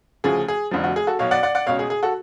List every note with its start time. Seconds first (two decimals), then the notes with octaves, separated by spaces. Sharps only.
0.24 D2 C#3 F3 G#4
0.48 G#4
0.71 F1 F2 D3 F3
0.84 F#4
0.96 G#4
1.07 F#4 A4
1.19 B1 B2 C#5 F5
1.31 D5 F#5
1.43 D5 F#5
1.55 D5 F#5
1.66 C#2 B2 C#5 F5
1.79 G#4
1.90 G#4
2.03 F#4 A4